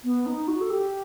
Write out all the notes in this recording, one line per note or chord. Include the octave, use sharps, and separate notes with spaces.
B3
D#4
F#4
A4
G4